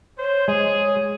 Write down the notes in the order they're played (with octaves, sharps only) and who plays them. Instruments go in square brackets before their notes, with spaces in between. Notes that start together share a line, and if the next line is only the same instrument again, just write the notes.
[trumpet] C5 [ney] C#5
[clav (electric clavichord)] G#3 [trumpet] G#4